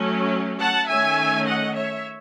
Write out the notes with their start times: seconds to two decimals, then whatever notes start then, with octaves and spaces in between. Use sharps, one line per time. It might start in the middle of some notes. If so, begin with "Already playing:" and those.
Already playing: F#3 A3 C#4
0.60 F#5 A5
0.88 D#3 A3 C#4 E5 G#5
1.46 D#5 F#5
1.75 C#5 E5